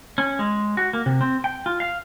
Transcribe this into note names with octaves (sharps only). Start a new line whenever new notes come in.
C#4
G#3
F#4
A#3
C3
C4
G5
F4
F5